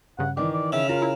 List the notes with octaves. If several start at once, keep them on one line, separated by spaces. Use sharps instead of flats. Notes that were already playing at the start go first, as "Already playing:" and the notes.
G2 C#3 F#5
D#3 E3 D5
D5
C#3 E5
F4 A#4 A#5
E4